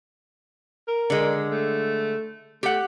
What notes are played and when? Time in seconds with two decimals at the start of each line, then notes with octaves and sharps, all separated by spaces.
0.88 A#4
1.10 D3 G#3
1.51 A3
2.63 A3 G4 F#5